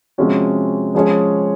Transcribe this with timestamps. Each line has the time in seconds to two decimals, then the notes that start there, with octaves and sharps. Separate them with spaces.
0.18 C3 F3 G#3 C#4 F#4
0.95 F3 G#3 C#4 G#4 C#5